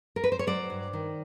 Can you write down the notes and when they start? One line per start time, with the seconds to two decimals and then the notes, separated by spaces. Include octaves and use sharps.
0.16 A#4
0.24 B4
0.32 C5
0.39 C#5
0.47 F#3 C5 D5
0.70 G2
0.93 D#3